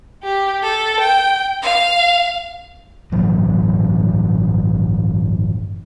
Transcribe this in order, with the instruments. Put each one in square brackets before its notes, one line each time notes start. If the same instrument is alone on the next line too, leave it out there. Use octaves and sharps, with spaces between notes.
[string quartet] G4
A4
G5
F5
[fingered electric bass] G1 A2 E3 F#3